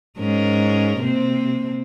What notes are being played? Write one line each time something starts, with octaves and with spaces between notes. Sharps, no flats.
G#2 C#4 A#4
C3 A#3 C4